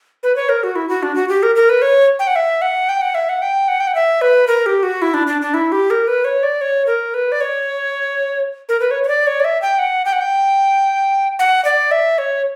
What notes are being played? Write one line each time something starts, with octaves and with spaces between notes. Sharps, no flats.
B4
C#5
A#4
F#4
E4
F#4
D4
F#4
G4
A#4
A#4
B4
C#5
G5
F#5
E5
F#5
G5
F#5
E5
F#5
G5
F#5
G5
F#5
E5
B4
A#4
G4
F#4
E4
D4
D4
D4
E4
G4
A#4
B4
C#5
D5
C#5
A#4
B4
D5
C#5
A#4
B4
C#5
C#5
D5
C#5
D5
E5
G5
F#5
G5
F#5
G5
F#5
D5
E5
C#5